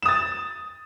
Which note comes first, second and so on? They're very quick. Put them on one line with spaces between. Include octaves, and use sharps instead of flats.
E7 D#6 A6